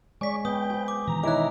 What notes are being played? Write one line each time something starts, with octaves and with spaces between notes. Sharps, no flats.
G#3 C#5 D5 G#5 C#6 B6
B3 B4 G5 D#6
F#4 C5 G#5
D6
B2 D#3 E3 A#5
D#4 E4 C#5 D6 F#6